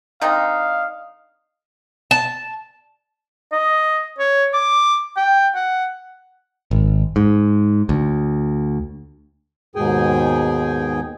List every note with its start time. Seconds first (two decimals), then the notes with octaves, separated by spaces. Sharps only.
0.22 D3 C4 D#4 F5
2.11 A5
3.52 D#5
4.19 C#5
4.54 D6
5.17 G5
5.55 F#5
6.71 G#1
7.16 G#2
7.89 D2
9.75 D#2 G#2 B2 G#4 G5 G#5